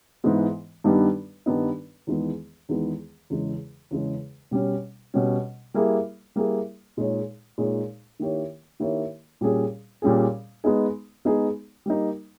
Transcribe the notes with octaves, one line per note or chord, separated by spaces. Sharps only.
G#2 E3 G#3 B3
G2 D#3 G3 B3 D#4
G2 D#3 G3 B3 D#4
E2 D#3 G#3 B3
E2 D#3 G#3 B3
E2 C#3 G#3
E2 C#3 G#3
B2 G3 C#4
B2 G3 C#4
G3 A#3 E4 G#4
G3 A#3 E4 G#4
A#2 G#3 D#4 G#4 C#5
A#2 G#3 D#4 G#4 C#5
D#3 A#3 E4 G4 C#5
D#3 A#3 E4 G4 C#5
A#2 G3 C#4 G#4
A#2 G3 C#4 G#4
G#3 B3 D#4 G#4
G#3 B3 D#4 G#4
G3 A#3 D#4